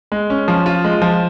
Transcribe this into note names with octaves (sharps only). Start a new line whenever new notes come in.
G#3
C#4
F3
F4
G#3
F3